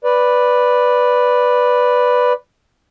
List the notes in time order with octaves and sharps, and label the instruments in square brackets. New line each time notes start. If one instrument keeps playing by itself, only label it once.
[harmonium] B4 D5